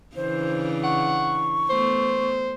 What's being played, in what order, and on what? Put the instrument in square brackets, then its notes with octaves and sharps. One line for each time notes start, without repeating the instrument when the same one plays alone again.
[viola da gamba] C#3 E3 D4 [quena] C5
[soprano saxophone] F#5 [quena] C#6
[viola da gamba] A3 B3 [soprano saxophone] C5